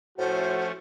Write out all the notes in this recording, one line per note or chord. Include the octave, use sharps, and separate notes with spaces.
A2 F3 A3 C#4 F#4 C5